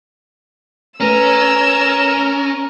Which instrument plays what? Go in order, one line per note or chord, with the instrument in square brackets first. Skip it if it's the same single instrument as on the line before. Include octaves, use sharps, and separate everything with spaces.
[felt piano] A3 B4 [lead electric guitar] C#4 [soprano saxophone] A#4 [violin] E6